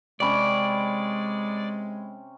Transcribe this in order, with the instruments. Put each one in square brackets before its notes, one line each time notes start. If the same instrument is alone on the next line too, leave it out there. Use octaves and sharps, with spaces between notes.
[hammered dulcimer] C3 C#4 B5 [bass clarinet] G#3 [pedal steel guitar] D5